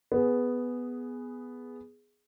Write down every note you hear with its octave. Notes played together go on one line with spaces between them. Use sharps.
B3 G#4